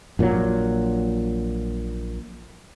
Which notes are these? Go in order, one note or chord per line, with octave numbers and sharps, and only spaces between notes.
A#1 A#2 D#3 F#3